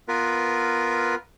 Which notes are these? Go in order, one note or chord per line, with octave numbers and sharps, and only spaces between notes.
B3 F4 A#4 B4